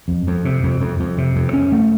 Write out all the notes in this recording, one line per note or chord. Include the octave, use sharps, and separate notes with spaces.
F2
F2
C3
F2
F2
F2
C3
F2
C#4
A3